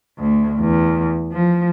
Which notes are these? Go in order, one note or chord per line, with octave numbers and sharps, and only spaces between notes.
D2
E2
F3